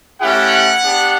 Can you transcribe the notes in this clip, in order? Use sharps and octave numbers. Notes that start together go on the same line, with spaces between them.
A3 C#4 E4 G4 F#5
B3 D4 G4